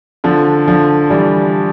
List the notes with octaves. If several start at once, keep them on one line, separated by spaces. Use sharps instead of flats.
D3 F3
D3 F3
E3 G3